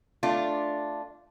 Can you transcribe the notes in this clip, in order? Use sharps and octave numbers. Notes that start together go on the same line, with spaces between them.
A3 D4 F4